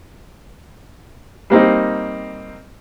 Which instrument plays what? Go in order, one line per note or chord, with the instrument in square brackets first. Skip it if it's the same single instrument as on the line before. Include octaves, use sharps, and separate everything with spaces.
[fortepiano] G3 A#3 C4 D#4